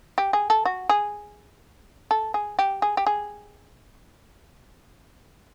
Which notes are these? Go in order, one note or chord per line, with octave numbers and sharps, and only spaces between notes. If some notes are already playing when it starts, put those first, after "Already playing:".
G4
G#4
A4
F#4
G#4
A4
G#4
G4
G#4
G4
G#4